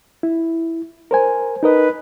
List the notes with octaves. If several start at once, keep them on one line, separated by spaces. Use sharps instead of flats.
E4
A#4 C5 G#5
D#4 A#4 B4 D#5